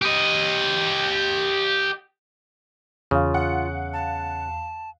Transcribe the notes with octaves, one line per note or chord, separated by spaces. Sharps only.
G4 D#5
E2 C#3 F4 F5
F#5
A5